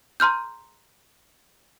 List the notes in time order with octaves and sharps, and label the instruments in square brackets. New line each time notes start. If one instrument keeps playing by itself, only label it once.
[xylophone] A#5 C6 F6 G6